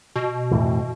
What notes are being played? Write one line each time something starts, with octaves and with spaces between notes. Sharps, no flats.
B2
F2 A2 E3